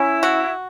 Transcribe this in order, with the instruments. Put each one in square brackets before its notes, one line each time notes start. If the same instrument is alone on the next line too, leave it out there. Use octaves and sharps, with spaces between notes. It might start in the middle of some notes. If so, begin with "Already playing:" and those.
Already playing: [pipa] C#4 [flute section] E4
[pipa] F#4